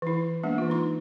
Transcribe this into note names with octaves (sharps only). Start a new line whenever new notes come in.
E3 E4
G#3 A#3 B3 D4
E3 F4
D#4 C6